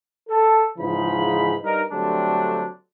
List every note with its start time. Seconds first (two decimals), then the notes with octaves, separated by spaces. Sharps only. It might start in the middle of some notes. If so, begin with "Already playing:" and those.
0.29 A4
0.78 G#2 C#3 E3 F3 D#4 B5
1.63 G2 D#4 A#4
1.92 D3 F#3 G3 A3 C4 D4